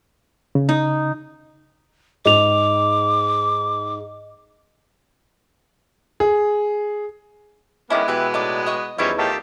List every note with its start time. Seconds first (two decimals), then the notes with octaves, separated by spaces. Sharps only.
0.55 C#3
0.69 D#4
2.25 G#2 D#5 D6 F7
6.20 G#4
7.90 D#3 G#3 B3 C#4 E4 D#5 D6
8.08 B2 E3 G4 B4 E5
8.34 A2 D#4 D5 D6
8.66 D#5 C#6
8.98 E2 F3 G3 C#4 D#4 E4 C#5 C#6
9.19 D#3 A3 F4 G4 A5